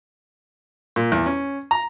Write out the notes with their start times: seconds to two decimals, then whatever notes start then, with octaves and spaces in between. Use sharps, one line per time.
0.96 A#2
1.12 E2
1.26 C#4
1.71 A#5